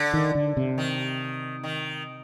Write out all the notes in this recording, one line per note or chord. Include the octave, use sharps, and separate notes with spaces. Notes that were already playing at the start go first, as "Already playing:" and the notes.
Already playing: D3
D#3
D3
C3
D#3
D#3